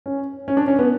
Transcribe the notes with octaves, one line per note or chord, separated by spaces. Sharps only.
C#4
C#4
D4
C#4
B3